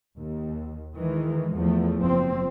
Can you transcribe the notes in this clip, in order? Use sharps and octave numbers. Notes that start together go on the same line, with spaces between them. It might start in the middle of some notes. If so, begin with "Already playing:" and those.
D#2
D#3 E3 G#3
E2 F3 A3
F#1 F3 C4